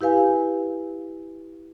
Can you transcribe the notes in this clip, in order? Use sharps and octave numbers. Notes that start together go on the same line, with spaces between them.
E4 G4 B4 F5 G#5